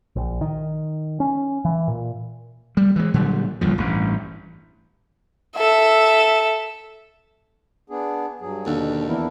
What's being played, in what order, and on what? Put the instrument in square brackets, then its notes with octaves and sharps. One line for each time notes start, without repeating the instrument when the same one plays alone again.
[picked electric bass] A#1
D#3
C#4
E3
A#2
[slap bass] G3
E3 G#3
A#2 D3 F#3 G3
F#1 D2 G2 F3
A1 G2
[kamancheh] A4 E5
[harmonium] B3 D4 G#4
G2 F#3 G#4
[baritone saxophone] D#2 [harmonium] B2 [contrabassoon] D3
[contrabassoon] E2 [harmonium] D4 E4 A#4